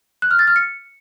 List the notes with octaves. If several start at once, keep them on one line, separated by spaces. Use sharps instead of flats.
F#6
F6
A6
F6
C#7